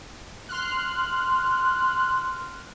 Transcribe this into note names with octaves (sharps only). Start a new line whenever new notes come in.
C6 F6 F#6